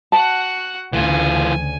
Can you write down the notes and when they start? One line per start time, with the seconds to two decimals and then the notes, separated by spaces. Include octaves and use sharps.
0.12 F#4 F#5 A5
0.93 D2 C#3 E3 F4 G#5